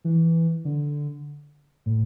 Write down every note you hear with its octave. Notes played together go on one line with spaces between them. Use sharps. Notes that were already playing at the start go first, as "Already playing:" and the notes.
E3
D3
A2